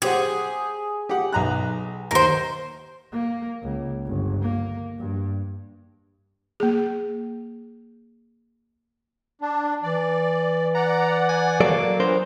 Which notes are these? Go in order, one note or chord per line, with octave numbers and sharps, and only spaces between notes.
G4 G#4 C5 F#5
G4 F#5
B1 A#5 F#6
D#2 A#4 C5
A#3
C#2
G1
A#3
G2
A#3 G#4
D4
E3 D5
D5 F#5 A#5
G#5
F#3 A#3 A4 D5
A#2 B3 D4 A#4 C5